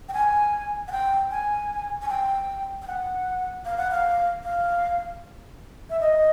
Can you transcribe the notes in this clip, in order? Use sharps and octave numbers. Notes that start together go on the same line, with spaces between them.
G5
G#5
F#5
G5
G#5
G#5
G5
G5
F#5
F5
F#5
F5
F5
E5
D#5